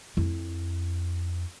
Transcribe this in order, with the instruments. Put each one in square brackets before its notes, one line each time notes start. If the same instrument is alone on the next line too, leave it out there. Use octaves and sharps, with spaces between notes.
[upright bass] F2 E4